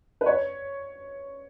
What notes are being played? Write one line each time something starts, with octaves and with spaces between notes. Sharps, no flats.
B4
C#5